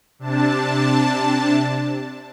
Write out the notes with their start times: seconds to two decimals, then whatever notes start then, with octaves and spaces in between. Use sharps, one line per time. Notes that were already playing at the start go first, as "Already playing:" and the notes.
0.19 C3 D4 A5